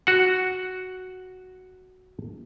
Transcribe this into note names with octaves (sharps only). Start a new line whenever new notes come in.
F#4 F#5